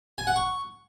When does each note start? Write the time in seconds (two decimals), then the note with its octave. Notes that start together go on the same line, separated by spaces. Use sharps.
0.18 G#5
0.27 F#5
0.36 C#6